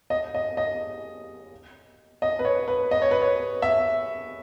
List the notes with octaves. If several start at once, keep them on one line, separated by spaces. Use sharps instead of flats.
D#5
D#5
D#5
D#5
B4
C#5
B4
D#5
C#5
B4
C#5
E5